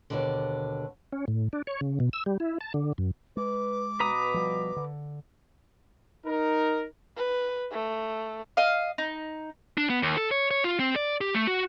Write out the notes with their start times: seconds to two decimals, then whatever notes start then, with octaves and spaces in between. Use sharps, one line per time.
0.10 D#2 B2 D3
1.12 C#4
1.28 A2
1.53 D4
1.67 C#5
1.81 C#3
2.00 B2
2.13 E6
2.26 G3
2.40 E4
2.61 A5
2.74 D3
2.98 F#2
3.37 G#3 B4 D6
4.00 B2 B4 A#5 D#6
4.34 F3 G3
4.76 D3
6.26 D#4 A#4
7.17 B4
7.72 A3
8.57 D#5 F5
8.98 D#4
9.78 D4
9.90 B3
10.02 D#2
10.17 A4
10.31 C#5
10.51 C#5
10.64 F4
10.79 C4
10.96 D5
11.21 G4
11.35 A3
11.47 F#4